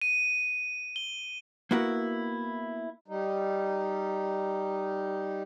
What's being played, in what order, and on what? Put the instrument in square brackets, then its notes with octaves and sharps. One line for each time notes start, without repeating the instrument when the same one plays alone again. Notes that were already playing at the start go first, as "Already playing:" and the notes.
[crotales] D#7
G7
[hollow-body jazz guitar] A#3 B3 E4 F#4 A#4
[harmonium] G3 D#4